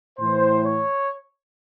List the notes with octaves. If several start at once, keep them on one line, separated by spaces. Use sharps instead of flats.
A2 E3 C5
C#5